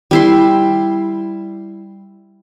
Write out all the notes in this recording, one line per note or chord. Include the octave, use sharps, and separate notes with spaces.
G3 E4 C6